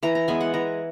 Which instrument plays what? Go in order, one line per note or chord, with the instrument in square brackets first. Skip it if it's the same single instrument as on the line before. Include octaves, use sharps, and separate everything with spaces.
[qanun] E3 A#5
A#5
G#3 B3 G#5
F#5
E3 A#5